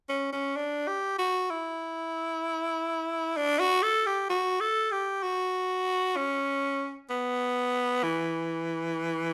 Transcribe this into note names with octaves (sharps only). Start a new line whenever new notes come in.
C#4
C#4
D4
G4
F#4
E4
D4
F#4
A4
G4
F#4
A4
G4
F#4
C#4
B3
E3